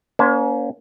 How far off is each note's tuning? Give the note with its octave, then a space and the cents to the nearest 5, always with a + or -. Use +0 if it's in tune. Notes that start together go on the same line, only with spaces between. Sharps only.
A#3 +30 C#4 +40 C5 +0